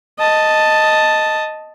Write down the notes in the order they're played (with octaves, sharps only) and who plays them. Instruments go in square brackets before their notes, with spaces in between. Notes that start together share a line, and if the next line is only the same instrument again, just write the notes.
[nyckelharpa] D#5 A5